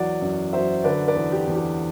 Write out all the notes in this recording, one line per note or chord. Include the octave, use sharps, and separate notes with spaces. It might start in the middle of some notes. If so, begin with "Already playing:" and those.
Already playing: E2 F#3 D5 F#5
F#2
F#3 C5 E5
D3 B4 D5
B4 D5
E2
G4
E2
G4